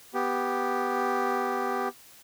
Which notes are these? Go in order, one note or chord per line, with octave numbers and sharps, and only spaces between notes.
B3 G4